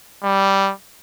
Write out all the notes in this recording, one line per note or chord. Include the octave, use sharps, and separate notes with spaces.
G3